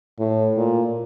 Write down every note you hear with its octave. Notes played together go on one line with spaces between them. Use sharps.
A2
A#2